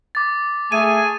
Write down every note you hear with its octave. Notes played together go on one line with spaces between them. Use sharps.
D6 A6
A3 G#4 G#5 D#7